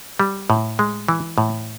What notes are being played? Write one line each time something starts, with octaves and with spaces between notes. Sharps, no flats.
G3
A2
G#3
E3
A2